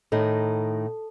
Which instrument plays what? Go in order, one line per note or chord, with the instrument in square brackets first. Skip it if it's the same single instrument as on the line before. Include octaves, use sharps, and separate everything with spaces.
[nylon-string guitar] A2 D#3 D#4 [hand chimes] A4